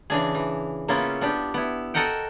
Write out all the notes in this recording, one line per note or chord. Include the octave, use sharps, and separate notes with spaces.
C#3 E3 D4 G#4
E3
C#3 A#3 B3 C#4 E4 F4
B3 D4 G4
B3 E4
F#4 A4 A#4 D#5 F#5 G5